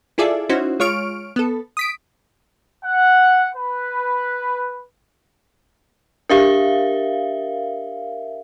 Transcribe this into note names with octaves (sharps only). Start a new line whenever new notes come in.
E4 F4 G#4 A4 D5 E5
C#4 D#4 E4 F#4 C5
G#3 F4 C#5 C#6 F6 D7
B3 A4
D#6 B6 D7
F#5
B4
D4 G4 A#4 E5 F5